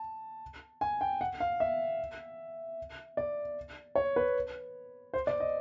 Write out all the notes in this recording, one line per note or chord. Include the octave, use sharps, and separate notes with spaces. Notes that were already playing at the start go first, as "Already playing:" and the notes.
Already playing: A5
G#5
G5
F#5
F5
E5
D5
C#5
B4
C5
D5
D#5